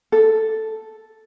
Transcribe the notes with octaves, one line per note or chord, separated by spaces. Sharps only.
A4